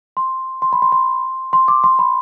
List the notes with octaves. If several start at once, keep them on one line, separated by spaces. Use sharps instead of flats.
C6
C6
B5
C6
C6
C6
D6
C6
B5